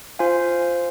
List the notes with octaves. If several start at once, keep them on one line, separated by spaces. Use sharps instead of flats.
F4 C5 F5 G#5